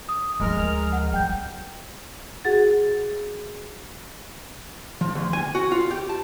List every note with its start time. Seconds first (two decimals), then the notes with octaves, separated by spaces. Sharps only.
0.09 D#6
0.40 D2 F3 G#3 A#4 F6
0.92 F#5
1.13 G3 G5 G6
2.45 F#4 G#4 F#5 A6
5.01 F3
5.15 D2
5.33 G#5
5.55 F#4
5.72 F4
5.91 G4
6.09 A5